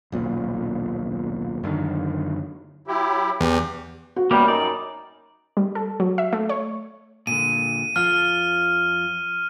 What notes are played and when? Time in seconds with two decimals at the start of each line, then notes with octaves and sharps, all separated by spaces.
0.12 D#1 B1 A#2
1.64 F#2 D3 D#3
2.87 F#3 E4 G4
3.40 E2 G4
4.16 F#4
4.31 F#2 G3 A#3 B3 G4
4.48 D#4 D5
5.57 G3
5.75 A4
6.00 F#3
6.18 E5
6.33 A3
6.49 C#5
7.27 A#2 D3 D#7
7.96 F2 F4 F6